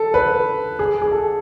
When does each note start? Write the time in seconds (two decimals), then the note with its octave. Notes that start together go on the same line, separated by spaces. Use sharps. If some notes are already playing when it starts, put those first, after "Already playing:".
Already playing: A4
0.14 B4
0.79 G#4
1.02 G#4
1.12 A4